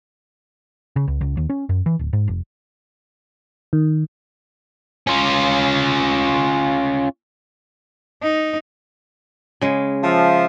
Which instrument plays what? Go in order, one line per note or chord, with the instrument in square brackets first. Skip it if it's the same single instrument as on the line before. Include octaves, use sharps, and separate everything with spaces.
[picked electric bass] C#3
C#2
C#2
D#2
C#4
F#2
E3
D1
G#2
F1
[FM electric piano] D#3
[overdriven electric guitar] C#4 F4
[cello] D#4
[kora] C#3 G#3
[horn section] F3 E5